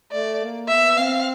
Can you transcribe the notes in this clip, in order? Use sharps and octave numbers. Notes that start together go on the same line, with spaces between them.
A3 D5
A#3
B3 E5
C4 F5